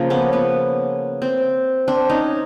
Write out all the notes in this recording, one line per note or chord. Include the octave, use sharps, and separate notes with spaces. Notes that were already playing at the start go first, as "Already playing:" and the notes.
Already playing: C#3 F3 A#3
B3 C#4
B3
C4
C4 D4
C#4 D#4